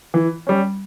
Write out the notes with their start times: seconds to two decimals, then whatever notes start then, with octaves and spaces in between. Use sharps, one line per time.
0.14 E3
0.47 G3 C#4